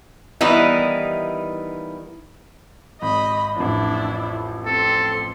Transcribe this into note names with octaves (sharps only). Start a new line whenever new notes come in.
D#3 E3 G3 B3 D#4 E4
G#1 D#5 B5
A1 F2 D4 E4
C4 A4 C6